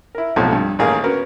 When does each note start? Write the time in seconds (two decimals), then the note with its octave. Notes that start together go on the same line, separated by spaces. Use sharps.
0.15 E4 A#4
0.36 B1 A2 C3 F3
0.53 G2
0.79 A1 D#2 G#4 A#4 F5
1.04 B3 C#4 F#4 A#4